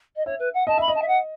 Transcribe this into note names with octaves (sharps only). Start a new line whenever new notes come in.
D#5
C#5 E5
B4
F#5
D#5 A5
E5 B5
D#5
A5
E5
F#5